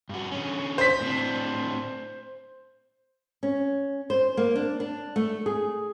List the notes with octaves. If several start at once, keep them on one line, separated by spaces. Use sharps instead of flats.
G2 F#4
D3 C#4
C5 B6
A2 C4 D4
C#4
C5
A#3
D4
D4
A3
G#4